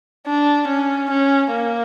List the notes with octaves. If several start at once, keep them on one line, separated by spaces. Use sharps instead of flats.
D4
C#4
C#4
A#3